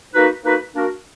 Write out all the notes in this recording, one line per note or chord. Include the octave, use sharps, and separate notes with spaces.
A#3 D#4 F#4 B4
A#3 D#4 F#4 B4
A#3 D4 F#4 A#4